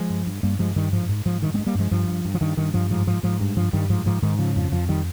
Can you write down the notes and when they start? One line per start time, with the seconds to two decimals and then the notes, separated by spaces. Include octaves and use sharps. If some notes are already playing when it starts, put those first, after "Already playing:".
Already playing: F3 G#3
0.10 G2
0.26 G2
0.43 G2 G3 A#3
0.59 G2 F3 G#3
0.76 G2 D#3 G3
0.92 G#2 F3
1.09 G#2
1.25 G#2 F3
1.42 G2 D#3
1.54 G#3 C4
1.58 G2
1.67 G3 A#3
1.75 G2 F3 G#3
1.91 G2 F3
2.08 G2
2.25 G2
2.35 F3
2.41 G2 D#3
2.57 G2 D#3
2.74 G2 F3
2.90 G#2 F3
3.07 G#2 F3
3.23 G#2 F3
3.40 G2
3.56 G2 F3
3.73 G2 D#3 G3
3.90 G#2 F3
4.06 G#2 F3
4.22 G#2 D#3
4.39 C#3 F3
4.56 F2 F3
4.72 F2 F3
4.89 D#3 G3